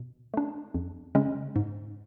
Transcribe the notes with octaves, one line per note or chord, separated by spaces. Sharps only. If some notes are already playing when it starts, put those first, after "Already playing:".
Already playing: B2
A3 D4
F2
C#3 G#3 C#4
G#2